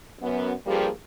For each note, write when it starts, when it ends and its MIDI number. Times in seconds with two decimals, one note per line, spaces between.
0.21 0.51 42
0.21 0.51 59
0.66 0.90 43
0.66 0.90 53
0.66 0.90 55
0.66 0.90 58
0.66 0.90 67
0.66 0.90 68